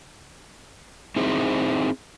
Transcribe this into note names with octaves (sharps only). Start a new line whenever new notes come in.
C4 D#4 E4 G#4 C5